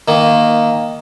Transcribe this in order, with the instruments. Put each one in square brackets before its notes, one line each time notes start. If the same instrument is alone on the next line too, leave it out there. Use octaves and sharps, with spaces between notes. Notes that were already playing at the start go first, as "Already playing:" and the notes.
[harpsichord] D#3 A#3